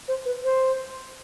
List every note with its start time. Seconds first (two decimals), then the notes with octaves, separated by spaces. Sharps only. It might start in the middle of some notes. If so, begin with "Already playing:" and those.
0.08 C5
0.25 B4
0.44 C5